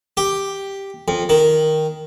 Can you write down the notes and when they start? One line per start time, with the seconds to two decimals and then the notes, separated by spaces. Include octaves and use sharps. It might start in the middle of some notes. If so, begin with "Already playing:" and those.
0.17 G4
1.08 F2
1.29 D#3